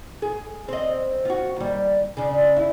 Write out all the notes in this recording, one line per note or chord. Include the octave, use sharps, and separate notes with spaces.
G#4
C4 D#5
F4 F#4
D#2 G3
C#3 D4
E4